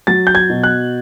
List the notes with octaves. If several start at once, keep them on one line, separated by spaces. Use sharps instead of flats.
F#3 A6
G6
G#6
B2
F#6